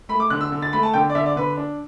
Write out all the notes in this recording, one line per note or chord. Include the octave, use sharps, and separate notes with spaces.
A3 B5
D6
D3 F#6
E6
D3
A6
A3 B5
A5
D3 G5
D5
D3 E5
D5
D3 B4
D4